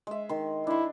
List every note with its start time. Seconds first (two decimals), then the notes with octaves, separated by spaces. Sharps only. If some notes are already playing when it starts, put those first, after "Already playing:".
0.07 G#3 E5
0.29 D#3 C6
0.67 D4 E4 C6